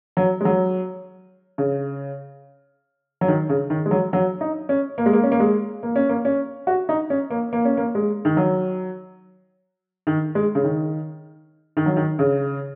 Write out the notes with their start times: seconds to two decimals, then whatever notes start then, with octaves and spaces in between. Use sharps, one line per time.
0.17 F#3
0.41 G#3
0.45 F#3
1.58 C#3
3.21 F#3
3.28 D#3
3.49 C#3
3.70 D#3
3.86 G#3
3.91 F#3
4.13 F#3
4.41 D#4
4.69 C#4
4.98 A#3
5.06 G#3
5.13 A#3
5.23 C#4
5.32 A#3
5.40 G#3
5.83 A#3
5.96 C#4
6.09 A#3
6.25 C#4
6.67 F#4
6.89 D#4
7.10 C#4
7.30 A#3
7.53 A#3
7.65 C#4
7.77 A#3
7.95 G#3
8.25 D#3
8.37 F#3
10.07 D#3
10.35 G#3
10.55 C#3
10.64 D#3
11.77 D#3
11.86 F#3
11.97 D#3
12.19 C#3